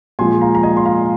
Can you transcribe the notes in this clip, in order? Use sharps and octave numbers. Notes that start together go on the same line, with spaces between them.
A#2 F3 G#3 G#5 C6
F5 A#5
A#5
D#5 G#5
C6
F5 A#5